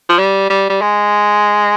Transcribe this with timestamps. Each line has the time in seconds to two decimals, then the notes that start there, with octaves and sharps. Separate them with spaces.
0.09 F3
0.18 G3
0.50 G3
0.69 G3
0.81 G#3